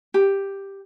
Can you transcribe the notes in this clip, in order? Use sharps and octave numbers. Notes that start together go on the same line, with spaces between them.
G4